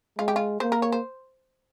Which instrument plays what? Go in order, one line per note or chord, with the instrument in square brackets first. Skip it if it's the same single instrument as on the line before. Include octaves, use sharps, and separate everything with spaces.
[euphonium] G#3 [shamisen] F4
[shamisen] G4
F4
[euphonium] A#3 [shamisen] C5
[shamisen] A#4
C#5
C5